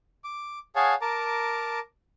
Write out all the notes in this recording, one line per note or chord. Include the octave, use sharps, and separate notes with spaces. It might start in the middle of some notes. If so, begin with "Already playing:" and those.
D6
G#4 C#5 F5 F#5 G#5 A5
A#4 A5 A#5 D6